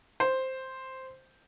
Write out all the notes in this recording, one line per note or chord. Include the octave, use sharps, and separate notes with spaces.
C5